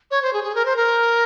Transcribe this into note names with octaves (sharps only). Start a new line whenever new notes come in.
C#5
C5
G#4
G#4
A#4
C5
A#4